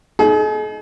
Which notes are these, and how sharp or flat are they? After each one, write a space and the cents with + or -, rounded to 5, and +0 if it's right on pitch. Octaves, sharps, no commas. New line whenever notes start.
D#4 +0 G#4 +45